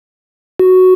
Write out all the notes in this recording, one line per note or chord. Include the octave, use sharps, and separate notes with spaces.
F#4